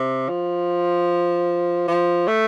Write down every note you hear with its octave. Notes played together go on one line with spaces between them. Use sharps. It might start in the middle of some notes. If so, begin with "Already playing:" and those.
Already playing: C3
F3
F3
A3